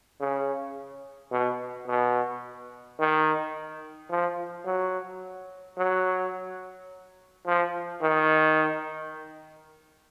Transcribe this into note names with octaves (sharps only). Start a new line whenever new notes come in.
C#3
B2
B2
D#3
F3
F#3
F#3
F3
D#3